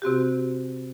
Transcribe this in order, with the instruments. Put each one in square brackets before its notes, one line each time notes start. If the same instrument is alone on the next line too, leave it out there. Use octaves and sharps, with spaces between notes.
[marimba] C3 C4 F#4 G4